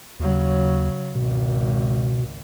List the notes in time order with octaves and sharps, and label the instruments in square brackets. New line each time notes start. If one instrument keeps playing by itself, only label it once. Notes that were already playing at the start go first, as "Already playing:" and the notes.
[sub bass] D#2 [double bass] C#3 F#3
[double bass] G#1 C#2 [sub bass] B2